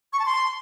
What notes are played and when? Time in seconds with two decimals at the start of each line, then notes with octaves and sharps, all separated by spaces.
0.13 C#6
0.19 A5
0.26 C6